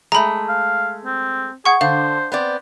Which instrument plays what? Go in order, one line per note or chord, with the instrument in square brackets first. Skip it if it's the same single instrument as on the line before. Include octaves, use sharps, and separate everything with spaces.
[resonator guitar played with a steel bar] G#3 A3 [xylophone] A#5 B5
[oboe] F5
C4
[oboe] G#4 [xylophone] F#5 C#6
[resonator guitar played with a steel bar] D3 [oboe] C5 [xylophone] F5
[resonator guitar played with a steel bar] B3 C4 D5